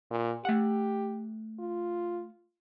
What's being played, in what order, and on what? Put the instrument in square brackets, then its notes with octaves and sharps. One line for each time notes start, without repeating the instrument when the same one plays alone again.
[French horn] A#2
[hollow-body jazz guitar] A3 F#5 [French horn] G4
[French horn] F4